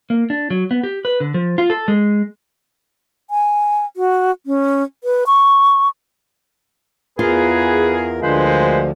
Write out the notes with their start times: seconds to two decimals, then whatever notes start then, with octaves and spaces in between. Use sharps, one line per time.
0.10 A#3
0.30 D4
0.50 F#3
0.71 B3
0.83 G4
1.05 B4
1.20 D3
1.34 F3
1.58 F4
1.70 A4
1.88 G#3
3.30 G#5
3.97 F#4
4.46 C#4
5.04 B4
5.27 C#6
7.19 E2 F4 G#4 A#4 B4
8.21 D2 D3 F3 G#3 A#3 B4 C5